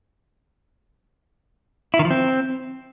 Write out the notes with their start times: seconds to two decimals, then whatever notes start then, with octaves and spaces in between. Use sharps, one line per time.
1.94 E4
1.99 D#3
2.05 F3
2.10 C4